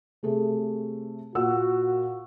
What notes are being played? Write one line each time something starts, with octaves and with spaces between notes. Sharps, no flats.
C3 A3 G#4
A#2 F#4 F#5 E6